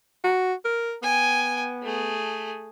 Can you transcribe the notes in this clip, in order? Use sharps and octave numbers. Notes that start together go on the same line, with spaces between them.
F#4
A#4
B3 G5 G#5
A3 G#4